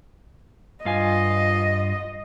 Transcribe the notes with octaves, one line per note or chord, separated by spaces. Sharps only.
G2 F4 D#5 G#5